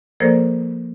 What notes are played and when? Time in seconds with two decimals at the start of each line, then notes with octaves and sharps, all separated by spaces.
0.20 F3 A#3 A4 A#4 C5 D5